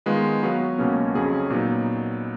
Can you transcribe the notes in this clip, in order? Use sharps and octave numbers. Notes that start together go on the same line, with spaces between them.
D#3 G#3 B3 F4 B4
F#3 B3 F#4 B4 F5
C#2 B2 F#3 A#3 C#4
F2 C#3 F#3 C#4 G#4
A#2 F#3 B3 D#4